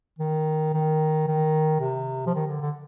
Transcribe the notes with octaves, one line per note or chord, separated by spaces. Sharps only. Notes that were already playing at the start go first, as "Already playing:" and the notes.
D#3
D#3
D#3
C3
F3
D#3
D3
D3